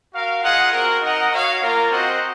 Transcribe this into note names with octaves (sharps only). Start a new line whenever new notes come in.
F#4 A#4 F5
F4 G#4 D#5 F#5
C4 F#4 A#4
D#4 A#4 D#5 F#5
F#4 C#5 F5
A#3 F4 A#4
C4 F#4 C5 D#5 F#5